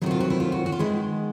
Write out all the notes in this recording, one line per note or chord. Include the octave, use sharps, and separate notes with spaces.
D2 C3 D#3 F#3 E4 F#4
F4
F#4
E4
F4
F#4
F#4
F4
D#3 G#3 B3 E4